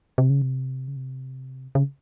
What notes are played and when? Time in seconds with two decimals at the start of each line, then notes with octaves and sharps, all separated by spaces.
0.18 C3
0.30 C#3
0.42 C3
0.88 C#3
0.97 C3
1.75 C#3